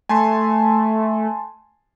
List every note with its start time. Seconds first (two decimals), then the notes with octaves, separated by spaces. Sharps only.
0.09 A3 G#5 A5 C6